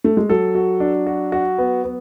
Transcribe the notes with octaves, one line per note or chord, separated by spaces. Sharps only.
A3
G#3
F#3 A4
F#4
D4
F#4
F#4
B3
B3